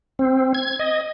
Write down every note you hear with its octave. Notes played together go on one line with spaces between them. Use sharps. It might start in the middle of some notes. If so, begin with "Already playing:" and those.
C4
G#6
D#5